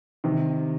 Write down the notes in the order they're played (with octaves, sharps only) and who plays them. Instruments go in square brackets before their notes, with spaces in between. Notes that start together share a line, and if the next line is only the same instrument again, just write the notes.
[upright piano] C3 D#3